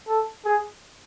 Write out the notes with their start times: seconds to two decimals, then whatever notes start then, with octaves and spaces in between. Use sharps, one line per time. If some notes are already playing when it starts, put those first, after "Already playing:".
0.08 A4
0.45 G#4